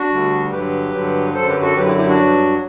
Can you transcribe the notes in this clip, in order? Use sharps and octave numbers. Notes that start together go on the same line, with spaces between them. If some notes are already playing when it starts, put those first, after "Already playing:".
Already playing: D4 F#4
D2 D3 G3
G2 D3 F#3 G4 B4
G2 D3 F#3
F#2 D3 F#3 A4 C5
G4 B4
F#4 A4
F#2 D3 F#3 G4 B4
E4 G4
E4 G4
D4 F#4
G2 F#3